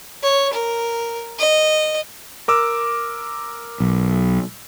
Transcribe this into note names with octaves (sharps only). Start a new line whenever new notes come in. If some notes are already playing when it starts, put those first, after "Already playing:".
C#5
A#4
D#5
A#4 D6 E6
B1